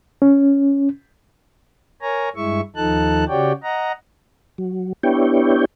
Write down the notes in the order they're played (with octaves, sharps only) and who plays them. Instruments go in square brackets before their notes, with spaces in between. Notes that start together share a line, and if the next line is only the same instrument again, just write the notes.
[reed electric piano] C#4
[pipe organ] A#4 C#5 G#5 A#5
G2 G#3 E4 E5 C#6
D#2 F3 D#4 A4 A5 F#6
C#3 F#4 G4 C#5 D5 G5
D#5 F#5 A#5
[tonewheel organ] F#3
B3 D4 E4 G4 C#5 G5